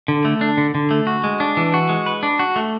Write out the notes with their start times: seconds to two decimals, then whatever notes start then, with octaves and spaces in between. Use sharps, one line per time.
0.08 D3
0.25 A3
0.41 D4
0.57 D3
0.75 D3
0.91 A3
1.07 F#4
1.24 G#3
1.40 D4
1.57 E3
1.74 F#4
1.89 G#3
2.06 B4
2.23 D4
2.39 F#4
2.56 A3